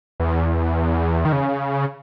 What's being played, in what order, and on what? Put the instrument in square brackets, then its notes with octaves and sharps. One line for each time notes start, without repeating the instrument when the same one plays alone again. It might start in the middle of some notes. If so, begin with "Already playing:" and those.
[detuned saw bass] E2
D#3
C#3